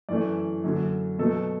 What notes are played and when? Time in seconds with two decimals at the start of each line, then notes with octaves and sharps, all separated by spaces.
0.09 F#2 E3 A3 D5
0.64 F#2 D3 F#3
1.18 B2 F#3 A3 A4